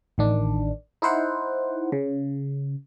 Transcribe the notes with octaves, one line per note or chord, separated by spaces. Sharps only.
A1 D#3 D4
D#4 E4 C5 F#5
C#3